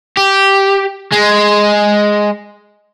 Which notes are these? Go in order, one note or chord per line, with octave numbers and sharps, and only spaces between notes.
G4
G#3